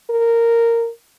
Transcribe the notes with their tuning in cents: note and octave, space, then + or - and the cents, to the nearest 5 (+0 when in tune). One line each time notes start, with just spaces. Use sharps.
A#4 -10